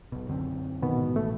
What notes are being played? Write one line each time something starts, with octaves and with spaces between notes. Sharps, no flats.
B1 B2
F#2 D3 C4
B2 D#3 B3
G#2
A1 A3